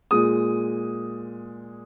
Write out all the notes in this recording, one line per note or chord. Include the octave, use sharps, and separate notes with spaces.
A#2 G#3 D#6